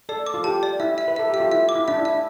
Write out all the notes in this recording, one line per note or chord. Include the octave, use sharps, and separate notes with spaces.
A4 D5
D6
F4
G4 A5
D5
E4 E5
E5
B4
A4 E5
G4 E5
F4
E4 E5
D6
E4
D4 E5
E4
E5